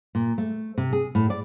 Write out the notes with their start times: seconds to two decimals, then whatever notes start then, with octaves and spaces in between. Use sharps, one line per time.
0.15 A#2
0.38 A3
0.78 C3
0.93 G#4
1.15 A2
1.30 D5